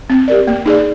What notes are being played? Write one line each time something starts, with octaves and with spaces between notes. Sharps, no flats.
C4
G4 A#4 D5
A#3
D#4 G#4 D5